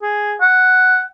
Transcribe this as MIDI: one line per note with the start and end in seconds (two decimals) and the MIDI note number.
0.02 0.35 68
0.41 1.02 78